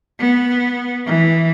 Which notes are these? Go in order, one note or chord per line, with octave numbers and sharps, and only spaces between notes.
B3
E3